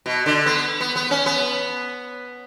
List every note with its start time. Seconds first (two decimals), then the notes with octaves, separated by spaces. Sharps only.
0.06 B2
0.26 D3
0.46 B3
0.81 B3
0.96 B3
1.11 C#4
1.26 B3